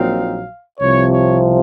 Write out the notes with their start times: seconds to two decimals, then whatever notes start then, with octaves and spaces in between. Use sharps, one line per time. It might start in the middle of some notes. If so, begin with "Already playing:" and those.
Already playing: A#1 A#2 F#3 C4 D#4 F5
0.80 C2 C3 F3 C#5
1.10 C#5